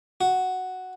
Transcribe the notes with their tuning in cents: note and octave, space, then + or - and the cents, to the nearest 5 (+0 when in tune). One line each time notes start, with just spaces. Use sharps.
F#4 +0